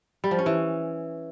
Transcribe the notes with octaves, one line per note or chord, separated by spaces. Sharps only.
G3
F3
C#4
E3